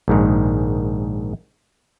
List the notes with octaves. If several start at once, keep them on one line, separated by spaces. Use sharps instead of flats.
A#1 G#2 D#3